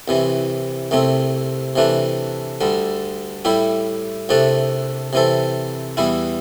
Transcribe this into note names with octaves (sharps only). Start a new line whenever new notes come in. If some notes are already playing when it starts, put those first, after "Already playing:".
C2 C3 E3
C2 C3 A3 C4
C3 E3 A3 D4
D2 D3 G3
A2 G3 E4 G4
C2 C3 A3 D4 A4
C3 E3 C4 A4
E2 E3 G3 E4